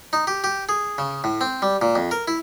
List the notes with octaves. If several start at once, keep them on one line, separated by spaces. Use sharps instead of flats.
D#4
G4
G4
G#4
C#3
A2
C4
G3
A#2
F2
A#4
E4